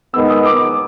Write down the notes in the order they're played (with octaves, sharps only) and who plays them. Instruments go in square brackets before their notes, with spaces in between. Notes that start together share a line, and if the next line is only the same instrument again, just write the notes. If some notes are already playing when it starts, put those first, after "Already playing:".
[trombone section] D#3 G#3 B3 [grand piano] E6
[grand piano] D#6
D6
D6